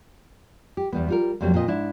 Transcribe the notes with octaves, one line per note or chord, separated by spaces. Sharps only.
G4
E2 G3 B3
G3 F4 A#4
F2 C3 F#3 G3 A#3 C4
A#2 C4 G#4 D#5
G#2 D4 E4